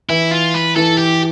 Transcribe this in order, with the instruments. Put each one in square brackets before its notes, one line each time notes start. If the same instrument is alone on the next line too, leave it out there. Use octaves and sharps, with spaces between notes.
[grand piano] E3 [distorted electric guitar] E4
[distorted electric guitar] F4
B4
[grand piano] E3 [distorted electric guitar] A4
[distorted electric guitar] G4